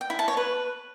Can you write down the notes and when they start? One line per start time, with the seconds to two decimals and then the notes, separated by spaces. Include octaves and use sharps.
0.01 G5
0.10 E4
0.19 A5
0.28 C#5
0.37 B4